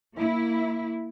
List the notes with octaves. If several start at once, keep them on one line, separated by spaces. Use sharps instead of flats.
A#3 E4